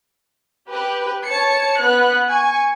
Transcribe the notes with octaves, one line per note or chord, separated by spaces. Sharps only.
G4 B4
C#5 A5 C#7
B3 B5 F#6
G#5 C#6